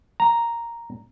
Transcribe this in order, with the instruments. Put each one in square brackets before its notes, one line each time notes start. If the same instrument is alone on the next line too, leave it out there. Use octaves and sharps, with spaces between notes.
[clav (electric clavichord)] A#5